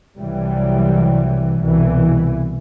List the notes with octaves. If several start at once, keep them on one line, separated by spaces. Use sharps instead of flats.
C2 C3 E3 F#3 G3
C2 B2 E3